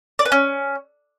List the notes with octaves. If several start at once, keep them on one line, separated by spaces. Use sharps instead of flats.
D5
B4
C#4